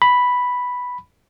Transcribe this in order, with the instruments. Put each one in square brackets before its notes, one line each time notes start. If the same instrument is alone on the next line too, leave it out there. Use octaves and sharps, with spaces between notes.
[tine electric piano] B5